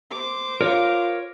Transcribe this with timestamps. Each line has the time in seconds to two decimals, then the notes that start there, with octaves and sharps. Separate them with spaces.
0.12 C5 D6
0.61 F4 A#4 C#5 F5